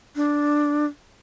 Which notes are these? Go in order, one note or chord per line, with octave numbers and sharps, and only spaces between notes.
D4